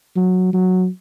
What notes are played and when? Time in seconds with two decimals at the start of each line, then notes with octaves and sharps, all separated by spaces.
0.16 F#3
0.53 F#3